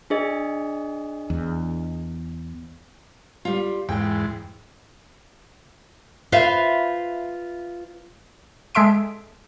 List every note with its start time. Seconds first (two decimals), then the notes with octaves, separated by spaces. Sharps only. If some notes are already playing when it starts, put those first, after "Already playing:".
0.10 D4 G#4 D#5
1.30 E2
3.45 G3 F4
3.89 E2 G#2 G5
6.32 F4 B4 C5 E5 F5
8.75 G#3 A4 E5 C6 D7